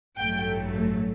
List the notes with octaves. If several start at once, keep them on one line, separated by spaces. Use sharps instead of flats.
A1 G2 F#3 A3 G5